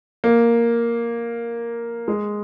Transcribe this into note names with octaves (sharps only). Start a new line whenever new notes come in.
A#3
G#3